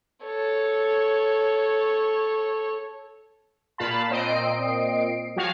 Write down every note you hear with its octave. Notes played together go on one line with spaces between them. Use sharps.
A4 C#5
A#2 F4 F5 A5 B5
A#2 C4 D#5 C7 D7
F3 F#4 C#5 F5 F6 C7